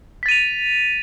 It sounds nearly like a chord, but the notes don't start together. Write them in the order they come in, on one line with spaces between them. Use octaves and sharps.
B6 A6 D#7 F7